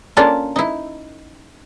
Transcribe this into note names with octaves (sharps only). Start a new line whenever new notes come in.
A#3 C#4 D4 F4 A4
D#4 E4